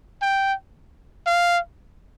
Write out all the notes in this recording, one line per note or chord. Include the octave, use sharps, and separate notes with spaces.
G5
F5